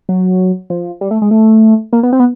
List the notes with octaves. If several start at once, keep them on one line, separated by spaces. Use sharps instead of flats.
F#3
F3
G3
A3
G#3
A3
A#3
B3
C4
B3